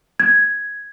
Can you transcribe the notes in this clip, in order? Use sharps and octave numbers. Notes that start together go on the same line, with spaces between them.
G#6